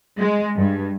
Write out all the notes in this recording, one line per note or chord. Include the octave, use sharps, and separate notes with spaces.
G#3
G2